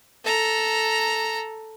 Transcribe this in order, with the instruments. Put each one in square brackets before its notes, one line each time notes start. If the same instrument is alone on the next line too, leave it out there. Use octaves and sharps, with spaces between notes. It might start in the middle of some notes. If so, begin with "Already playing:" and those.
[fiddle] A4 A#5